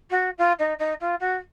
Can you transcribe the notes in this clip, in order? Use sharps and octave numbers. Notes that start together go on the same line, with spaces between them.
F#4
F4
D#4
D#4
F4
F#4